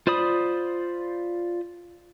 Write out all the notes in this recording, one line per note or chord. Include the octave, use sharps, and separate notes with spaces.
F4 C5 D5 B5 D#6